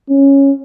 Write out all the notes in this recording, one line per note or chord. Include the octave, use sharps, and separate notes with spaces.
C#4